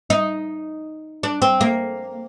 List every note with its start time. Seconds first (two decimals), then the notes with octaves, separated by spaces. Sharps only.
0.10 D#4
1.23 D4
1.42 C4
1.61 A#3